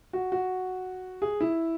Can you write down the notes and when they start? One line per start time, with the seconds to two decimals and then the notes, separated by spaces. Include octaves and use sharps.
0.13 F#4
0.32 F#4
1.22 G#4
1.41 E4